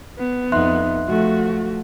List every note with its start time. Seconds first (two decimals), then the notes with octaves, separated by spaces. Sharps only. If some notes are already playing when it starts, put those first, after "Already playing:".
0.18 B3
0.52 F2 D#4 E5 C6 F#6
1.08 F3 A3 F#4